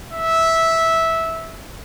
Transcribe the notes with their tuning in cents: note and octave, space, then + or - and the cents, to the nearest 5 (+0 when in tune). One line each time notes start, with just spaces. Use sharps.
E5 -10